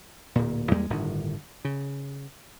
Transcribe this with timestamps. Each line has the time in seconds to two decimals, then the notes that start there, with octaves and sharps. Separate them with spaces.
0.35 D1 A#2
0.71 E2 G3 G#3 A#3
0.90 G1 A2 D3 D#3
1.65 C#3